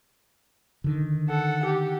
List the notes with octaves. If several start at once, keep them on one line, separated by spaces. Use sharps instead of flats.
D3 D#3
A4 F#5
G4